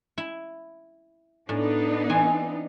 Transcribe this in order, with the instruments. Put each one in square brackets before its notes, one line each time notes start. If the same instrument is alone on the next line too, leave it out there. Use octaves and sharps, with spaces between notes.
[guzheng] E4
[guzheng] A2 [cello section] B3 D4 D#4
[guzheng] E3 C4 G#5